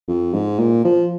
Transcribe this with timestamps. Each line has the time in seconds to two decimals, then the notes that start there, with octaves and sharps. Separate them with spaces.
0.08 F2
0.34 G#2
0.59 A#2
0.85 F3